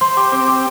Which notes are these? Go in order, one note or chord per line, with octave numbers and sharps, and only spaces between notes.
C5 C6
G4 D6
C4 D6
G4 D6